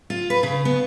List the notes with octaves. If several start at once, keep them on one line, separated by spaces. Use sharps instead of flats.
F4
B4
C#3
B3